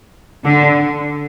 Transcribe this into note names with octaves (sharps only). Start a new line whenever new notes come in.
D3